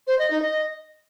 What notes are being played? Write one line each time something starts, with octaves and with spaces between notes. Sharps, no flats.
C5
D#5
D#4
D#5